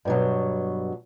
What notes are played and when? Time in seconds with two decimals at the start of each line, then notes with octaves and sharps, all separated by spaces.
0.05 G2 B2 F#3